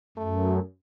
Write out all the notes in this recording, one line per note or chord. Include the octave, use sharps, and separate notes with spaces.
F#2 A3